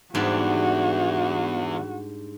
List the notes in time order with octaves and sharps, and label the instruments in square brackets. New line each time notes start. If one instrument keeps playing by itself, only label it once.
[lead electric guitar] E2 [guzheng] G#2 G3 D4 [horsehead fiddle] F#4